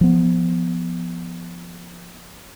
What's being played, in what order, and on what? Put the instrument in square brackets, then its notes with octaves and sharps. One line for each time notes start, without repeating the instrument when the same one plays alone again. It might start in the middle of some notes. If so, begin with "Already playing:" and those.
[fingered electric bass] F3 B3